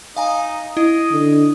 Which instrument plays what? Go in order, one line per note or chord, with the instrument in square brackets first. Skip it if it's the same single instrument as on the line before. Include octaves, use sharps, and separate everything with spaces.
[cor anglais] D#4 [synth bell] F5 G#5 A#5
[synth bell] E4 [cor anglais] D#5
[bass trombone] D3